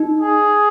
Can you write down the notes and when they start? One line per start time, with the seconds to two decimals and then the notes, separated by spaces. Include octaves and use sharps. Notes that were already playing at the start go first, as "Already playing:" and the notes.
Already playing: D#4
0.20 G#4